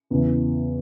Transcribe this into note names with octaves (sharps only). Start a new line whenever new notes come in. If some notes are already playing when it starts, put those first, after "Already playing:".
E2 C#3 E3